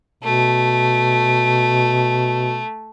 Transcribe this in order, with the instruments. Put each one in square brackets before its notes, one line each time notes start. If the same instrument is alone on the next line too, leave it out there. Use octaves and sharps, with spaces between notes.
[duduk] B2 [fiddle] A3